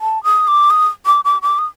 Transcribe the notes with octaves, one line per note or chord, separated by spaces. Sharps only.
A5
D#6
D6
D#6
D6
D6
D6
D#6